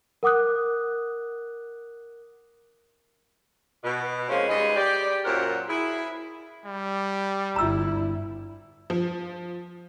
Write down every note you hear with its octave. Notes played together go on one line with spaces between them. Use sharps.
A#4 F#5 D6 D#6 F#6
B2
F3 G#3 A#3 C4 C#4
G3 G#3 C#4 D#4 B4 D#5
G4 D5
F#2 A#2 F#3 A#4 C5 F#5
E4 G#4
G3
G1 E4 A#5 E6
F3